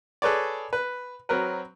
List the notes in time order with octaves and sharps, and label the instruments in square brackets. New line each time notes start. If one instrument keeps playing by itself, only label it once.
[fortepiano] G#4 A4 B4 C#5 D5
B4
F#3 C4 A#4 B4